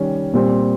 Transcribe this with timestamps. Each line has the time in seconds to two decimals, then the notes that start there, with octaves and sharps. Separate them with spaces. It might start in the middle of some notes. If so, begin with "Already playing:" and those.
Already playing: D#3 G3 C#4
0.34 A#2 G3 C4